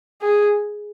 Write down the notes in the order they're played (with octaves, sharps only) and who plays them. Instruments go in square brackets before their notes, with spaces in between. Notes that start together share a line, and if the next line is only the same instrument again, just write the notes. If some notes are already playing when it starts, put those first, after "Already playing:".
[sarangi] G#4